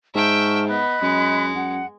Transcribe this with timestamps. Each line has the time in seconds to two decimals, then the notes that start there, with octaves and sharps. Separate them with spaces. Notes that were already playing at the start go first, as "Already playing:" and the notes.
0.15 G#2 E5 G5 A5 C#6 F6
0.67 B3 D#5 B5 F#6
1.02 F#2 G#3
1.55 F#2 F#5